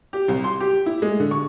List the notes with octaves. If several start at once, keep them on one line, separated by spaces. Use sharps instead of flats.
G4
C2
C6
G4
E4
G#3
D3
C#6